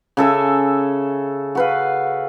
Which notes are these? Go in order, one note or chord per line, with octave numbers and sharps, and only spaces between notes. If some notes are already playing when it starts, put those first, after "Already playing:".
C#3 A4 E5 G#5
F#4 B4 F5